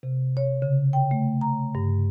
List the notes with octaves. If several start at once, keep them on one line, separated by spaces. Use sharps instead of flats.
C3
C#5
C#3
G5
A3
A#5
G2